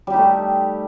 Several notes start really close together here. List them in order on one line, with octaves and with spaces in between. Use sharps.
G3 G4 D#4 A3